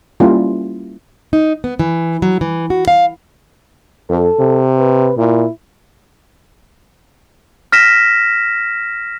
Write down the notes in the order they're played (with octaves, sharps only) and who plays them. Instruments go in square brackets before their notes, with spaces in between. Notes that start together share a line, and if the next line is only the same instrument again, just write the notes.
[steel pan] G3 A#3 C#4 E4 F4
[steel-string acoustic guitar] D#4
B3
E3
F#3
E3
F#4
F5
[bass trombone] F2 [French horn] A4
[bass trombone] C3
[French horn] B4
[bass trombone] A#2 [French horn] E4
[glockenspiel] F6 A#6 B6 E7